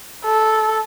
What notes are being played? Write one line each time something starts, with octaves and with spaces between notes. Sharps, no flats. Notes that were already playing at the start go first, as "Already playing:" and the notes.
A4